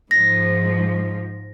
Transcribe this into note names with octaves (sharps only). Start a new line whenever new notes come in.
G#2 F3 A#6